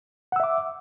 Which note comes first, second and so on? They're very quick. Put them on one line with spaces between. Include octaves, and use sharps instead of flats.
F#5 E6 E5 D6